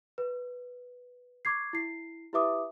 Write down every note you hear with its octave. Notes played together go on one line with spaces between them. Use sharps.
B4
C#6 D6 G#6 C7
E4 C7
E4 G4 B4 E5 D6 D#6